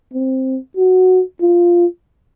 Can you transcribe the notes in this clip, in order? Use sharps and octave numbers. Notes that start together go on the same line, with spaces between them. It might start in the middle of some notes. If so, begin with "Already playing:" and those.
C4
F#4
F4